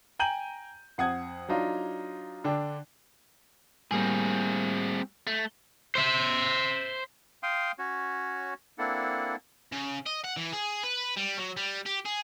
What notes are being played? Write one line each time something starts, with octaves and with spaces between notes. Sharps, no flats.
G5 G#5 A#5 G6 D#7 F#7
F2 F#5 D#6 G#6
F#3 D4 D#4 F4
D3 D4 G5
A2 G3 A#3 C4 G#4
A3
C5 E5
F5 G5 C6 D#6
C#4 F#4 C#5
A#3 C4 D4 E4 A4 F#5
C#3
D#5
F#5
E3
G#4
B4
G3
F#3
G3
G4
G#4